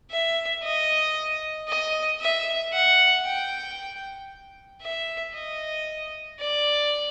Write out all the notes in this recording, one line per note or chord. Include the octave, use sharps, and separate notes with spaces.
E5
D#5
D#5
E5
F#5
G5
E5
D#5
D5